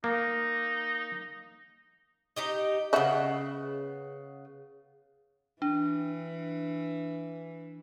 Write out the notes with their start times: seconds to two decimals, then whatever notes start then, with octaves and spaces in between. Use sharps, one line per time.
0.04 A#3 D#4
2.36 D#4 G4 D#5
2.93 C#3 B3 D#5 E5 F#5
5.62 E3 D4